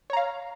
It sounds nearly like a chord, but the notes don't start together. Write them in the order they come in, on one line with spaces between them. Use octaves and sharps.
C#5 A#5 F5